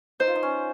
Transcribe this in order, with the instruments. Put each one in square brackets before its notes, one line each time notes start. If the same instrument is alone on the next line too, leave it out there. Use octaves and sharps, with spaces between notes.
[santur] D#4 [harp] C5
[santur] F4
D#4
C#4